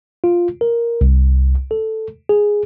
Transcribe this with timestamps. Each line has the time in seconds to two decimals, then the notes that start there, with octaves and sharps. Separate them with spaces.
0.24 F4
0.61 A#4
1.01 C2
1.71 A4
2.29 G#4